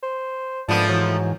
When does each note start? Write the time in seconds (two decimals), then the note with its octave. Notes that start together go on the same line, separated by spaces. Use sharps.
0.03 C5
0.69 G#2 F3 A3 B3 D4
0.89 E3 F#3